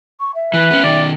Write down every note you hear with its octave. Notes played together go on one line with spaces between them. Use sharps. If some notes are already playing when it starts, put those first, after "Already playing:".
C#6
E5
E3 B4
B3 C#4
B2 D#3 D5